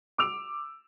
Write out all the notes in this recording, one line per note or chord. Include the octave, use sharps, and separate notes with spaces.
D6 E6 D7 F7